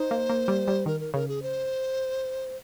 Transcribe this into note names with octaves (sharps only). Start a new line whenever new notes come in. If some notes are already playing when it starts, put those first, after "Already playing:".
Already playing: D#4 C5
A#3
A#3
G3
G3
D#3 A#4
A#4
C#3 A#4
G#4
C5